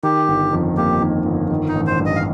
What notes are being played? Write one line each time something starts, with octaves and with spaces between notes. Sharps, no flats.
D#3 G4
G1
F2
A#3 G4
D#3
G1
D#3
D#4
A1
C5
G2
D#5
F5